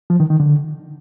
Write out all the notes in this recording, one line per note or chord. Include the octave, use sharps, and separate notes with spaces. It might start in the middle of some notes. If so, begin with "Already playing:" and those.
F3
D#3
D#3
D3